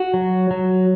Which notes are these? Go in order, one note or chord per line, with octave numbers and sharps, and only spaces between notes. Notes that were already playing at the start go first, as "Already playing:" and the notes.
Already playing: F#4
F#3
F#3